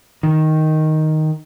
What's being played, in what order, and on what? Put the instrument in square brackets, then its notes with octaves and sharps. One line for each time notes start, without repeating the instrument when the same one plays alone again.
[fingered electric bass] D#3